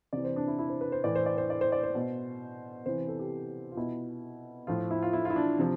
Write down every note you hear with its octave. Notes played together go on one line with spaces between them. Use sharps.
C3 E3 D5
C5
D4
E4
E4
C5
B4
C5
A2 E3 D5
C5
D5
C5
D5
C5
D5
C5
B2
C3 E3 C5
A4
G4
F4
B2 E4
A2 F3 F4
E4
F4
E4
F4
E4
D4
C3 F3